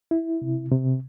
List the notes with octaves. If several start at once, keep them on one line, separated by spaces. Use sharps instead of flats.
E4
C3
C3